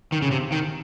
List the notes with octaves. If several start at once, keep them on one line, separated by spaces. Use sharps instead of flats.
D#3
C#3
C3
D#3